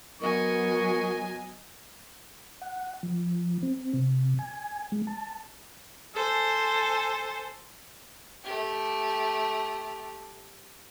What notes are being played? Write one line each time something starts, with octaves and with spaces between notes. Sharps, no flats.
F#3 B3 A#4 D#5 G#5 C#6
F#5
F3
C4
C3
G#5
G#3
A5
A4 C5 G#5
A3 G4